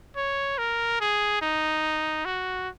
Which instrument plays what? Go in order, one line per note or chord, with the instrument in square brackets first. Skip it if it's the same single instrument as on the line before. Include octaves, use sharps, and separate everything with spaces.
[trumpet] C#5
A#4
G#4
D#4
F#4